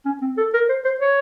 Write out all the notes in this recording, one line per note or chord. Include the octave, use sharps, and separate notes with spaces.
C#4
C4
A4
A#4
C5
C5
C#5